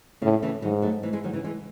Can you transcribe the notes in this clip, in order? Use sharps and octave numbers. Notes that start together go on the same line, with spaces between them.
A2 C#3
C#3 E3
G#2 D#3 F#3
F#3 A3
E3 G#3
E3 G#3
D#3 F#3
C#3 E3
E3 G#3